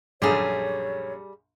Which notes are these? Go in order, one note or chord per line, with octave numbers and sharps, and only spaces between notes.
A#1 F#2 D3 G3 G#4 C#5